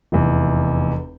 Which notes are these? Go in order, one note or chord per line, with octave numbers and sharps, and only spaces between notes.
F1 E2